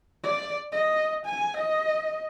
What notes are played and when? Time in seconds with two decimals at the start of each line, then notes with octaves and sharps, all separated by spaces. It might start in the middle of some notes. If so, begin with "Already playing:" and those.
0.24 D5
0.72 D#5
1.25 G#5
1.57 D#5